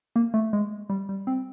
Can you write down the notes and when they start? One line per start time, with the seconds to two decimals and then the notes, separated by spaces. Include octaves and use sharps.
0.16 A#3
0.34 A3
0.53 G#3
0.90 G3
1.09 G3
1.27 C4